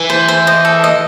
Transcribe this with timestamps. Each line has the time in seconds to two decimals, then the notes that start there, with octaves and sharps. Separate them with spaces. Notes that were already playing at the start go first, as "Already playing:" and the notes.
Already playing: E3
0.10 C5
0.28 C5
0.47 D#5
0.65 A4
0.84 D#5